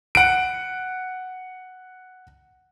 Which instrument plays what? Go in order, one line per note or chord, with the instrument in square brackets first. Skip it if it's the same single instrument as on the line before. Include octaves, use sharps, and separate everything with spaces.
[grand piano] F#5 D7